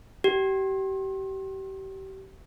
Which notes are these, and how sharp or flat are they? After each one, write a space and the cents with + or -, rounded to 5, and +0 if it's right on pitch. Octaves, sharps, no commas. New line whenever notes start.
G4 -30